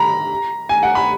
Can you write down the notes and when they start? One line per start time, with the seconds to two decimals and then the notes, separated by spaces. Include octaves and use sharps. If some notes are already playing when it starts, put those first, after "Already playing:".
Already playing: A#5 B5
0.69 G#5
0.83 F#5
0.95 B5